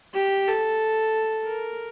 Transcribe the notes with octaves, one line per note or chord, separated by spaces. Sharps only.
G4
A4
A#4